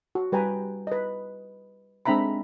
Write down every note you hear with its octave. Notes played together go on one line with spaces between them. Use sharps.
F#4
G3 B4 G5 G#5 A#5
B4 D#5
G#3 C4 D4 E5 A#5 B5